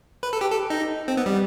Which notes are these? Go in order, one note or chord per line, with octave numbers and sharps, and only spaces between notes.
B4
A4
G4
A4
D#4
C4
B3
G3